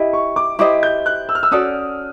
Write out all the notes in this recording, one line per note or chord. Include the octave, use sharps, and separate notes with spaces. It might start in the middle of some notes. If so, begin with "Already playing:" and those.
Already playing: E4 G4 D#5
C#6
D6
E4 G4 C5 D#5 D6
G6
F#6
E6
F6
E6
C#4 F#4 A4 D5 D#6